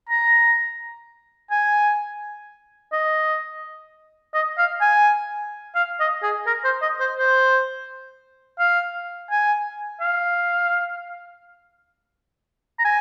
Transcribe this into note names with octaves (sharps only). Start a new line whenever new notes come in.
A#5
G#5
D#5
D#5
F5
G#5
F5
D#5
G#4
A#4
C5
D#5
C5
C5
F5
G#5
F5
A#5
G#5